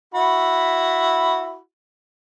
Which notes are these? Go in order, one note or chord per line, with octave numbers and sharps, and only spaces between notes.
E4 F#4 B5